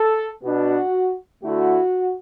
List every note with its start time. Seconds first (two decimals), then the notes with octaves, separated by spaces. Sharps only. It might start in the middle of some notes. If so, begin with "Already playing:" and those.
Already playing: A4
0.43 B2 B3 D4 F#4
1.42 D3 A3 E4 F#4